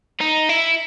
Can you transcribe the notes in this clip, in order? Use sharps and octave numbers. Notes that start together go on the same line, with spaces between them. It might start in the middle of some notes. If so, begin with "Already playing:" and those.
D#4
E4